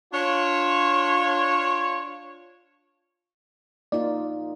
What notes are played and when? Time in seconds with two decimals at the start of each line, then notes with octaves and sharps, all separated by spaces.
0.13 D4 F4 C#5
3.92 A#3 D#4 F4 D5